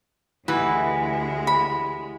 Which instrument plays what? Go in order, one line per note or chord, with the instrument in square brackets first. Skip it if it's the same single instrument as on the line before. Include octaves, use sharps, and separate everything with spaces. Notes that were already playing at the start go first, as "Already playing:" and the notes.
[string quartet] D2 G#3 [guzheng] E3 [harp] E4 F#4 G4 [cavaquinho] B4
[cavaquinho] B5